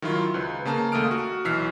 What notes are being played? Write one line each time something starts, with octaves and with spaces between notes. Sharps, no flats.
D#3 F#3 E4 F4
C#2 B4 C5
C#3 A#3 A5 A#5
D#2 A3 A#3 D#6 F6 D7
F#4
B1 E3 E6 F6 B6 C7